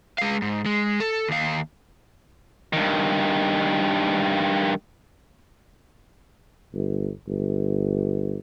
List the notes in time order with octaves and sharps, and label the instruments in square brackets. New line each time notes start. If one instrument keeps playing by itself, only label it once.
[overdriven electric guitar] G#3 F5
G#2
G#3
A4
D#2 F5
[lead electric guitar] G2 D#3
[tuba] G1
G1